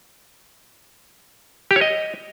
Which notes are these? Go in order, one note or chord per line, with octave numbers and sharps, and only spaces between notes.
G4
C#5
D#5